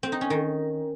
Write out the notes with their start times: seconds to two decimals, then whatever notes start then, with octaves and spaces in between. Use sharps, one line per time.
0.03 C4
0.12 D#4
0.21 C#4
0.30 D#3